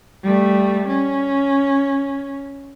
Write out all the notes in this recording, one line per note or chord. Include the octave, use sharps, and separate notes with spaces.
G3 A3
C#4